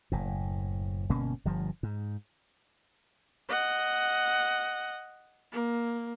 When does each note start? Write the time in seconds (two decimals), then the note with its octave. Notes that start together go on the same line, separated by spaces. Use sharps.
0.12 F#1 A2
1.09 G1 B2 A#3 C#4
1.45 G1 G2 F3
1.83 G#2
3.49 D#5 F#5
5.52 A#3